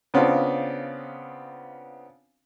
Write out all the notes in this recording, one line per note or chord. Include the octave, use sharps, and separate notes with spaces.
C#3 B3 C4 D4 F4